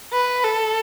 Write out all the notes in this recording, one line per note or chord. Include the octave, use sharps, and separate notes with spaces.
B4
A4